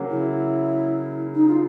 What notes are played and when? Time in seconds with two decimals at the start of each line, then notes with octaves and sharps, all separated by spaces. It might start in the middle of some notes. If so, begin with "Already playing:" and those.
Already playing: C#3 F#3 A#3
0.10 E4
1.34 D#4
1.47 F4